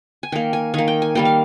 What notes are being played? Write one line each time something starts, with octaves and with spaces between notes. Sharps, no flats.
G#5
D#3 A#3 G5
G#5
D#3 A#3 G#5
G5
G#5
D#3 G3 A#3 G5
F5